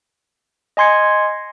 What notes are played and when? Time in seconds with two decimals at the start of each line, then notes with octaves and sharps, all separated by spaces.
0.77 D#5 G#5 C6 G#6 C#7